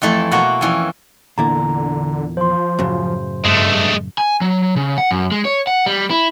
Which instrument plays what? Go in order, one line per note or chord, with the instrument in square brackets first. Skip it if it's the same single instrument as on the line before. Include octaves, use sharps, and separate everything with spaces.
[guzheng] F2 E3 A3 E4
B2 A#3 F#4 F#5 A#5
F2 E3 C#4
[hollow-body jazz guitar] E2 A#2 E4 [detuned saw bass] D3 [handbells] A#5
[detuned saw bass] F3 [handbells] C5 C6
[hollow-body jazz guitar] F#2 A2 C#3
[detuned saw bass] G2 [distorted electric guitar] G#3 A3
[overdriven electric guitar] G#5
F#3
C#3
F#5
F#2
G#3
C#5
F#5
G3
E4